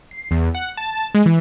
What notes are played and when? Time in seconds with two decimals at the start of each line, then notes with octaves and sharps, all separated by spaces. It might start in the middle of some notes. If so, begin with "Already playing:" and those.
0.11 C7
0.31 E2
0.55 F#5
0.77 A5
1.15 G#3
1.26 E3